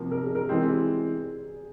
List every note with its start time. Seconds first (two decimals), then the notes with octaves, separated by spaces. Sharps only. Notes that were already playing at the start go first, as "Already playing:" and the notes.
Already playing: C3 F3 A#3
0.11 A#4
0.23 G#4
0.35 A#4
0.49 E3 G#3 C4 G#4
0.68 G4